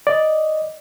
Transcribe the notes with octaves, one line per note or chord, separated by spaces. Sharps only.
D5 D#5